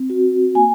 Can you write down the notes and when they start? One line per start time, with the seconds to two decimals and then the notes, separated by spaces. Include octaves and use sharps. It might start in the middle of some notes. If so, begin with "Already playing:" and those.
Already playing: C4
0.10 F#4
0.55 A#3 G#5